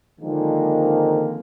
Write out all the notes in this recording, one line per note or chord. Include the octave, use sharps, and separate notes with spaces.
D3 D#3 F3 G#3 A#3 C4